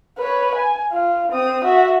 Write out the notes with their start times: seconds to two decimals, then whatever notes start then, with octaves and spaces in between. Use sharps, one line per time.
0.18 B4 C#5
0.55 G#5
0.92 F4
1.31 C4 D#6
1.64 F#4 E5